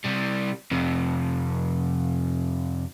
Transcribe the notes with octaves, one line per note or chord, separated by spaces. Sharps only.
C3 G3
F2 C3